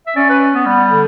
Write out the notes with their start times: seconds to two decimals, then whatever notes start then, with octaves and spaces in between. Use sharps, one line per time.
0.07 E5
0.16 C#4 D5
0.29 B4
0.54 B3
0.66 G3 B3
0.91 D3